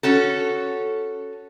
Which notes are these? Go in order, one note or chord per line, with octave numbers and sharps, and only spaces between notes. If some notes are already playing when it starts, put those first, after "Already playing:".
C#4 F#4 A4